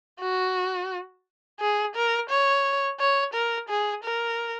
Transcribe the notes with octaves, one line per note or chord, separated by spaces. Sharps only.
F#4
G#4
A#4
C#5
C#5
A#4
G#4
A#4